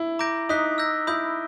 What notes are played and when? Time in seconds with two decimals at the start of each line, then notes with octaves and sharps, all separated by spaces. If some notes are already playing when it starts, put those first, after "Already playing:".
Already playing: E4
0.19 A#5 D6 G6 A#6 D7
0.49 D#4 D#6 F#6 B6
0.78 E6 G6 A#6
1.07 E4 B5 D#6 G6